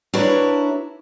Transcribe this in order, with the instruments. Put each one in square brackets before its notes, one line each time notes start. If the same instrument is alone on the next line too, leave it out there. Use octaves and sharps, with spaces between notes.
[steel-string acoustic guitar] D4 E4 F#4 A#4 B4 C#5